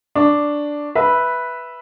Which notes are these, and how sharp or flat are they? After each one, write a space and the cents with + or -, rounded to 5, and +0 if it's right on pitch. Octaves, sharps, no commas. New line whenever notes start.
D4 +0 C#6 +0
B4 -5 E5 +0